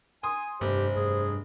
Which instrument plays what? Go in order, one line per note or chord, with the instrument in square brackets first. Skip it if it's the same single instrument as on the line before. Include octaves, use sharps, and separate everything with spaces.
[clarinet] G#5 [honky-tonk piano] C6 D#6
[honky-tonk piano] F1 [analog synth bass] G2 [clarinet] G4 [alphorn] C5
[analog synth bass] G2 [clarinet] G#4